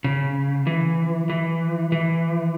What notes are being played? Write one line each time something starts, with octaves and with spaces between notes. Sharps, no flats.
C#3
E3
E3
E3